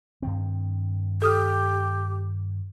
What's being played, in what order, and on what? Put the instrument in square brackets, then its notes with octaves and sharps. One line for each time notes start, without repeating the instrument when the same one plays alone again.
[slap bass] G2 D#3 C4
[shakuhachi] G4 [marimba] A4 D#6 F6